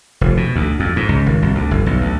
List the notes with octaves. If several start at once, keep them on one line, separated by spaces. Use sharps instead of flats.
F1
B2
D2
F2
G#2
C#2
G#1
C2
D2
G1
B1
D2